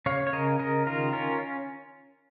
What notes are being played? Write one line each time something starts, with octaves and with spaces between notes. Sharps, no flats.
C#3 C#5 F5
C#5
C#3 A#4 D#5
C#3 A#4 D#5
D#3 F4 A#4
C#4 F4 A#4